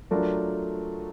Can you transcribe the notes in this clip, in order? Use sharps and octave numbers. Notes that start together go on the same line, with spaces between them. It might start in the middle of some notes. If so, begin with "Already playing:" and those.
F#3 A3 D4 F4 A#4